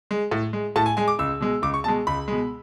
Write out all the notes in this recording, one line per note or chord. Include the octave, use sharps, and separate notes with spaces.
G#3
A2
G#3
A2 A5
G#5
G#3 G#5
D6
C#2 E6
B2 G#3
C#2 D6
C#6
B2 G#3 A5
C#2 B5
B2 G#3